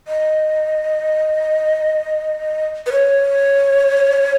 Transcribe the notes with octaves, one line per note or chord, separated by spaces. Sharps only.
D#5
B4
C#5